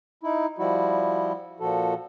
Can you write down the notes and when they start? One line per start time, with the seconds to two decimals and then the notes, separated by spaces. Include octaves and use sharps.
0.23 D#4 E4
0.58 F3 G3 E4 F#4
1.60 A#2 F3 F#4 A4